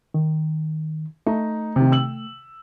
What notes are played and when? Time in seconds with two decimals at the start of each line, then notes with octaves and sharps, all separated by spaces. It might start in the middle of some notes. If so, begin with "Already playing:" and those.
0.14 D#3
1.27 A3 D#4
1.76 C3 D#3
1.92 E6 F#7